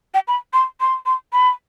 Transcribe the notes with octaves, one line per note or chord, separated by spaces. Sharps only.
G5
B5
C6
C6
C6
B5